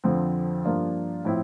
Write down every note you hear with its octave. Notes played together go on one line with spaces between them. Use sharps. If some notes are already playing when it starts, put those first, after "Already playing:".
F2 D3 F3 C4
G2 F3 A#3 D4 F4
A2 F3 C4 E4